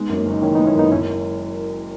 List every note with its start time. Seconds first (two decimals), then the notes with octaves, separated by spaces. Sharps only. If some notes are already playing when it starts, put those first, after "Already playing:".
Already playing: G#3 B3 D#4
0.09 F#2
0.17 A#3 C#4
0.26 F#1
0.32 D#4
0.42 D#3 C#4 E4
0.55 B3 D#4
0.59 G#3
0.67 C#4 E4
0.75 F#2 B3 D#4
0.91 F#1 C#4 E4